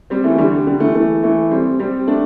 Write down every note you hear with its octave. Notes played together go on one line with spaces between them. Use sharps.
G3 C4
E3 A3
A3
D3 G3
D3 G3
E3 A3
E3 A3
E3 A3
G3 C4
G3 C4
A3 D4